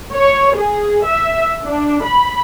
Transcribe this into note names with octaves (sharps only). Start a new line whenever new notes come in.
C#5
G#4
E5
D4
B5